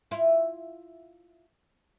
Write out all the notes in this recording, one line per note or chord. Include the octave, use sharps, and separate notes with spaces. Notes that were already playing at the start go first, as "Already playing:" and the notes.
E4 F4